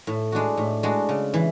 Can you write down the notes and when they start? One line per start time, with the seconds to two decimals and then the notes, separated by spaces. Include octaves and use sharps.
0.07 A2
0.32 G#3 D4 F#4
0.57 A2
0.83 G#3 D4 F#4
1.09 C#3
1.34 E3